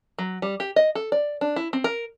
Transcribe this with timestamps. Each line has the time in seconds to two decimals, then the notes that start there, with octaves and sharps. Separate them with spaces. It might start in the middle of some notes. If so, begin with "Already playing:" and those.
0.19 F#3
0.42 G3
0.60 G4
0.76 D#5
0.95 A4
1.12 D5
1.41 D4
1.56 E4
1.73 C4
1.84 A#4